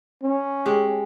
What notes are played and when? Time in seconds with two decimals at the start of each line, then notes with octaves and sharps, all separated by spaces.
0.22 C#4
0.66 G#3 G4